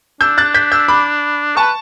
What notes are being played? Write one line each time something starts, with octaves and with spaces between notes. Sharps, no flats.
D4 E6 G6
F#6 A6
G6 B6
E6 G6
B5 D6
B4 A5 C#6